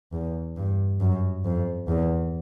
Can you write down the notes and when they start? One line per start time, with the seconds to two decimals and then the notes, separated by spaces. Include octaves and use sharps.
0.12 E2
0.57 G2
1.00 F#2
1.44 F2
1.88 E2